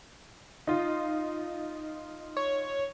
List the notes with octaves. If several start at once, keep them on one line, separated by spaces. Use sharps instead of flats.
D#4 F4
C#5